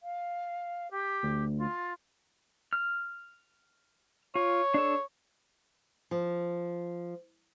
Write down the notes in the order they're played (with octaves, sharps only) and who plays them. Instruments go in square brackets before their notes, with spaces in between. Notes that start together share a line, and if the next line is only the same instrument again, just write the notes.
[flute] F5
G4
[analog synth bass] D2
[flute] F4
[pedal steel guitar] F6
[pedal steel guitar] F4 [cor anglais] C#5
[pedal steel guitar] D4 A4
[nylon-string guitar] F3